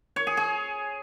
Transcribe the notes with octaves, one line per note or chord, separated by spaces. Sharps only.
C#5
G#4
G#4